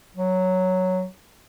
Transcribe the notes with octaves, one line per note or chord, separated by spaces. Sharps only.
F#3